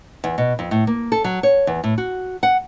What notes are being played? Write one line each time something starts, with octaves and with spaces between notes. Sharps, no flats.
E2
B2
F2
A2
A#3
A4
F#3
C#5
E2
A2
F#4
F#5